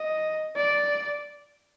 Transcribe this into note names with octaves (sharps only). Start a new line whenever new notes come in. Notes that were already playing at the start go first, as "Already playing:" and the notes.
Already playing: D#5
D5